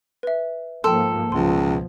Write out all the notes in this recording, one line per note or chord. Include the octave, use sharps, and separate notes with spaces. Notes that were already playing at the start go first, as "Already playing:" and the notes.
B4 E5
G#2 F3 A#3 A4 G5 C6
C#2 B2 F3 C6